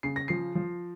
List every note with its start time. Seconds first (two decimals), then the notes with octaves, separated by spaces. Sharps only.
0.03 C#3 C7
0.16 A#6
0.28 F3 C7
0.55 F3